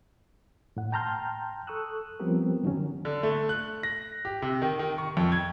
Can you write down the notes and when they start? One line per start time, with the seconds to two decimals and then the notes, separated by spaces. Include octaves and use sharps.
0.77 A2 F#5
0.92 G5 A5 A#5 C6 F6 G6
1.67 A4 C#6 D#6 E6 F#6
2.20 F3 G3 B3 C4 G4 A#4
2.64 D3 D#3 F#3 C#4
3.05 D3
3.23 A3
3.49 F#6
3.83 A#6
4.25 G4
4.42 C3
4.62 D#3
4.79 D#3
4.98 C#6
5.17 F2
5.32 G#6